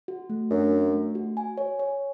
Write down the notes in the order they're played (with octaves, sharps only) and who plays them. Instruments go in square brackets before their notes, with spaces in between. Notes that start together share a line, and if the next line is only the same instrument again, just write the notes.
[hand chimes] F#4
A3
[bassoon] F#2 [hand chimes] D4
[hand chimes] F#4
A3
F#4
G#5
C#5
C#5